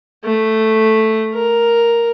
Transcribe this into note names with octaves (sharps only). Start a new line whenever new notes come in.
A3
A#4